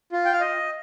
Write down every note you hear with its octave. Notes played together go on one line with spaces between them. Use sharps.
F4
G5
F5
D#5